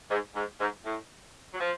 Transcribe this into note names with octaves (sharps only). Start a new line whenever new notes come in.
G#2
G#2
G#2
A2
F#3
F3